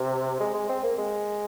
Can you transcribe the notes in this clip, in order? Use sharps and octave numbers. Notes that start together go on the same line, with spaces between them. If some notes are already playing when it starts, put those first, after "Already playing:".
Already playing: C3
G#3
G#3
C4
A#3
G#3